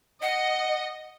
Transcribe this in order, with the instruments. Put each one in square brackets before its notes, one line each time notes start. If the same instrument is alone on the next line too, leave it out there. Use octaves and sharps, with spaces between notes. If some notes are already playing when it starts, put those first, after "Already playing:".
[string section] D#5 [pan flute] F#5